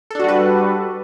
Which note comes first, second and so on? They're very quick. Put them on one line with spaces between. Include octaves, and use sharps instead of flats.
A4 D4 F#4 G3 B4